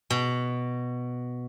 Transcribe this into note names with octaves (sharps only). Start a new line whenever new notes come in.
B2